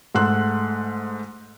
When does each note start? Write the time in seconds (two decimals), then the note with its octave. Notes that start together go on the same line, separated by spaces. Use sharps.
0.15 G#2 A3 F#5 C6 F#6